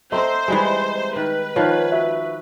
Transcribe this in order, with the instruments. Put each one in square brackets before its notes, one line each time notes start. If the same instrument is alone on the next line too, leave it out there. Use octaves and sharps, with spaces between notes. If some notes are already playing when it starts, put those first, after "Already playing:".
[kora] A3 C4 [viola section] C5 [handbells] D#5 E5 A#5
[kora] E3 G3 G#3
[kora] D#3 [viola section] B4
[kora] D#3 F3 [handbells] C#5 F#6
[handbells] F#4 E5